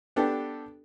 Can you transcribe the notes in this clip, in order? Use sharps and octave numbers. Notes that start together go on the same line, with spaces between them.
B3 D4 G4 A4